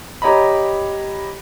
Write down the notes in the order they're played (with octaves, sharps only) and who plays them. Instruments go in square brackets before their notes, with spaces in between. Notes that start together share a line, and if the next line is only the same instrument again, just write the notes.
[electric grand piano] G4 C#5 D#5 A#5 B5